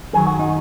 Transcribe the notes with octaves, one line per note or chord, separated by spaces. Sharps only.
F#2 D#3 F#3 G#4
F#4
D#4